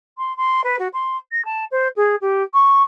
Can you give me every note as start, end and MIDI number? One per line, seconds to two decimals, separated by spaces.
0.18 0.35 84
0.37 0.61 84
0.64 0.76 71
0.79 0.88 66
0.93 1.17 84
1.32 1.44 94
1.45 1.64 81
1.71 1.88 72
1.96 2.15 68
2.21 2.43 67
2.53 2.82 85